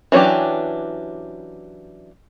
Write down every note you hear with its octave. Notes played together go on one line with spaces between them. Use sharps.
E3 F#3 C#4 D4 G4